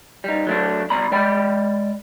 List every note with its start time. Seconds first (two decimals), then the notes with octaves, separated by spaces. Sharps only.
0.24 G3 D#4
0.47 F#3 A3 D4
0.90 C2 B2 D5 A#5 B5
1.12 G#3 D5 G5 B5